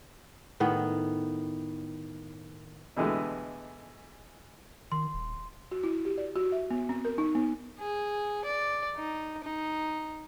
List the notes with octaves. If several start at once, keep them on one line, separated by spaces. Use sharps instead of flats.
A2 D#3 B3
B2 D3 E3 G#3 A3 G4
D#3 C6
D#1
F#4
E4
G4
D5
F#4
E5
B3
C4
A#4
D#4
B3
G#4
D5
D#4
D#4